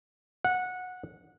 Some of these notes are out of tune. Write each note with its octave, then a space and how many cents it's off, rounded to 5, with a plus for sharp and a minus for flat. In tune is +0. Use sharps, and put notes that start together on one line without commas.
F#5 -15